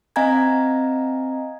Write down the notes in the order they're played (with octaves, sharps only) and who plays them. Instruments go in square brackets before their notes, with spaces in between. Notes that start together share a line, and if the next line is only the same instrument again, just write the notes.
[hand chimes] C4 D#5 F5 G#5 A#5 G#6